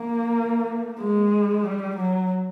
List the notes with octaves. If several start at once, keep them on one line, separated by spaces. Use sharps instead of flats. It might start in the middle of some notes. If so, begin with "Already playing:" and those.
Already playing: A#3
G#3
G3
F#3